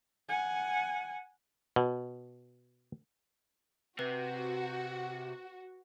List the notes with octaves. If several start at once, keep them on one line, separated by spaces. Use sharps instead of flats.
F#5 G#5
B2
C3 F#4 B4